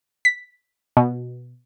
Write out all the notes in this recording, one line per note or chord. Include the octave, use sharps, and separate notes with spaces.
B6
B2